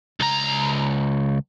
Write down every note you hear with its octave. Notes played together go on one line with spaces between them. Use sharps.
C#2 A#5